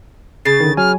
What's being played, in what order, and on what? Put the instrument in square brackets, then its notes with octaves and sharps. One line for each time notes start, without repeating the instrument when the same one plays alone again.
[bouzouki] C#3 [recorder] A6 [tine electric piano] C7
[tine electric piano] D3 D#3
[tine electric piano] F#3 G#5 [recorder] F6